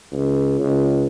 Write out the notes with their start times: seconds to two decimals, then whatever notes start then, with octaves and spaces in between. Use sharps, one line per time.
0.12 C#2
0.59 C#2